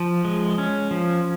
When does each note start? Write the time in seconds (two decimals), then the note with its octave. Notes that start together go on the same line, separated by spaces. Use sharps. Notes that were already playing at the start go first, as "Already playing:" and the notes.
Already playing: F3
0.25 G#3
0.58 C#4
0.91 F3